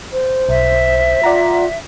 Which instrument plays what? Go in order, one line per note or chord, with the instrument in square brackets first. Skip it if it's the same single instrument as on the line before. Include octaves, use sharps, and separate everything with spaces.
[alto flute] C5
[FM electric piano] B1 [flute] E5
[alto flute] F4 [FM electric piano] D5 F#5 A#5